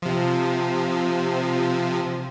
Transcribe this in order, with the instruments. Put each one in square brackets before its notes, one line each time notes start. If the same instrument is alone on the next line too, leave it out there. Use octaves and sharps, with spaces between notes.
[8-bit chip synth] C3 F3